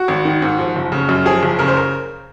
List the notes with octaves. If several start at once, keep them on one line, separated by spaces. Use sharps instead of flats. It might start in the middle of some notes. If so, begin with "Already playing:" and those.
Already playing: F#4
G#1
D#3
G#2
F3
F#1
C#3
F#2
F3 G#4
F#1
C#3 A#4
C5
A#4